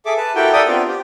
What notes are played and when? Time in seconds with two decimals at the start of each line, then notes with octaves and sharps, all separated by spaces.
0.06 G#4 A4 E5 D6
0.17 B4 A5
0.35 E4 F#4 G4 A4 A#4 G5
0.53 A4 A#4 D5 E5 G5 D#6
0.68 B3 C4 D4 F4 G4 A#4
0.88 G4